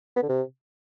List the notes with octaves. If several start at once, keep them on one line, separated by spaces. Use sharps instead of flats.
B3
D3
C3